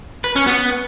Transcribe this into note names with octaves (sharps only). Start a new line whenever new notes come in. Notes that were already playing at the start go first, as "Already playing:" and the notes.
B4
C#4
B3